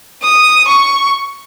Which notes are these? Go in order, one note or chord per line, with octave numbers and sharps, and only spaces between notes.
D#6
C#6